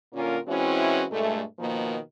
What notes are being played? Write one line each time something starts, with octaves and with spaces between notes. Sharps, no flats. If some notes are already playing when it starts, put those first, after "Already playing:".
A#2 D3 A#3 C#4 F4 A#4
E3 G#3 C4 C#4 E4 F#4
G2 A#2 G#3 A3
B2 D#3 F3 A#3